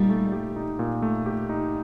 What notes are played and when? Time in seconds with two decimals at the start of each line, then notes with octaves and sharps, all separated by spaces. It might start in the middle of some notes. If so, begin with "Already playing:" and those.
Already playing: A#2 G3 D#4
0.09 A3
0.32 G4
0.56 D#4
0.79 A#2
1.02 A3
1.26 G4
1.49 D#4